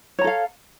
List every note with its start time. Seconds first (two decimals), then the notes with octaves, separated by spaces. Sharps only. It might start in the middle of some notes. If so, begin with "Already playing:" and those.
0.19 C#5
0.21 A#5
0.24 A4
0.27 F5